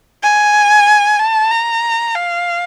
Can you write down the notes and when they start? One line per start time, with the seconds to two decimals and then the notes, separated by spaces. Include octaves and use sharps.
0.23 G#5
1.19 A5
1.51 A#5
2.15 F5